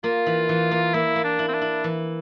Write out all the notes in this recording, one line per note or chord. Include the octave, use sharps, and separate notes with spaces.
A#3 F4
E3
E3
A#3
A#3 E4
A#3
D4
E4
C4
D4
E4
E3